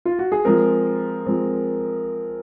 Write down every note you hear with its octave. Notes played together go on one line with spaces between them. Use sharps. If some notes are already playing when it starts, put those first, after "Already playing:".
F4
F#4
G#4
F3 G#3 C4 A#4
F3 G#3 C4